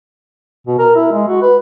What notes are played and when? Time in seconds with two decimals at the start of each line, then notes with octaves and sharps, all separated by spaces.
0.67 B2
0.79 A#4
0.96 E4
1.12 G#3
1.28 F#4
1.42 B4